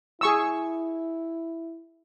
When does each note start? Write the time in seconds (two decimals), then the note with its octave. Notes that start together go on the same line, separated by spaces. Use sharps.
0.21 E4 G#4 C#6 E6